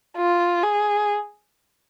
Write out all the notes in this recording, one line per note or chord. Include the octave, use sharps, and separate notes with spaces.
F4
G#4